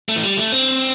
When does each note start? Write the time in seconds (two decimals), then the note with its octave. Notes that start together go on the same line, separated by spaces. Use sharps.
0.09 A3
0.16 E3
0.23 G3
0.37 A3
0.52 C4